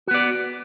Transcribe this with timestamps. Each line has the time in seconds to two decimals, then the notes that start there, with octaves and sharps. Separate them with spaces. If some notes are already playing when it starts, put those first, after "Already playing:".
0.07 F#4
0.11 B3
0.14 D5